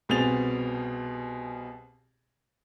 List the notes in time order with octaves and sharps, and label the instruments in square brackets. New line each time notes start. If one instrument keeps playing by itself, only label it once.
[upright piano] C2 B2 C4 G#4 A6 F7